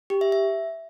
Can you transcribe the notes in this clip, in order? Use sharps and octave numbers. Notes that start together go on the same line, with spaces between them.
G4
E5
E5